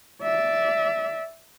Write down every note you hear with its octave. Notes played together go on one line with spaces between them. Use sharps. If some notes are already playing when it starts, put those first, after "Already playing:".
D5 E5